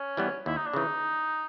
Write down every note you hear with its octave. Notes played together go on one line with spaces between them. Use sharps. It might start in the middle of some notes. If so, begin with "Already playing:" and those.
Already playing: C#4
E3 G3 B3
D#2 E4
D#4
D4
C#3 E3 D#4